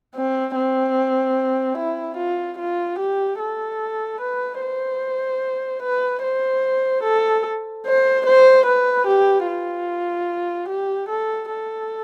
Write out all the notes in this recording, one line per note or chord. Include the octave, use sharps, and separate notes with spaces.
C4
C4
E4
F4
F4
G4
A4
B4
C5
B4
C5
A4
C5
C5
B4
G4
F4
G4
A4
A4